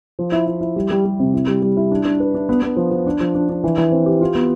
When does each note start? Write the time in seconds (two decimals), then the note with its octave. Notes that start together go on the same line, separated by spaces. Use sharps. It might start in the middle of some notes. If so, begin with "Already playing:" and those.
0.19 F3
0.32 E4
0.47 E4
0.61 E4
0.76 G3
0.91 G3
1.05 G3
1.20 C3
1.34 E4
1.47 G3
1.62 G3
1.77 E4
1.91 D4
2.05 D4
2.20 B4
2.35 D4
2.49 B3
2.62 B3
2.77 F3
2.91 F3
3.07 D4
3.20 F3
3.35 D4
3.49 D4
3.64 E3
3.78 E3
3.92 C4
4.06 G4
4.21 F4
4.35 B3